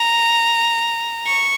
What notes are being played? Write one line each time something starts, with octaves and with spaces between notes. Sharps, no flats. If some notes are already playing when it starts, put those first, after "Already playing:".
Already playing: A#5
C#6